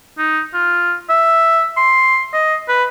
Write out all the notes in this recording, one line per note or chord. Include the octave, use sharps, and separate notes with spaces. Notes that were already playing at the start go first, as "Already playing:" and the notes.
D#4
F4
E5
C6
D#5
B4